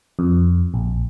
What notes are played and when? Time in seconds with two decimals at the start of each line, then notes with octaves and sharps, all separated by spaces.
0.19 F2
0.74 A#1